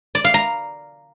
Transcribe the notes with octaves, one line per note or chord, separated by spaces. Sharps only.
D5
F5
A#5